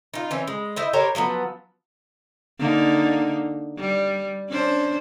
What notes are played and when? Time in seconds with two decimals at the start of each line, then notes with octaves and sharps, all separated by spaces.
0.14 D#4 F4
0.31 E3 C4 C#4
0.47 G#3
0.76 E4 C5 D#5
0.93 G4 A#4 C5 C#5
1.15 F3 F#3 A#3 B3
2.59 D3 A#3 D#4
3.78 G3
4.50 C#4 D4 C5